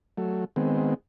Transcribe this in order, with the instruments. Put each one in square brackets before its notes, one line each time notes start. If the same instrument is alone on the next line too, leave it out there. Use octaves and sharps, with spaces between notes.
[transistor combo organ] F#3 A3
D#3 G#3 B3 C4